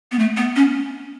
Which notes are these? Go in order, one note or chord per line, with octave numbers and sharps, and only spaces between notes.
B3
A3
B3
C#4